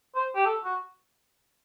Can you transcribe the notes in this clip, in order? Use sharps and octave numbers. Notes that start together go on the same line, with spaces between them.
C5
G4
A4
F#4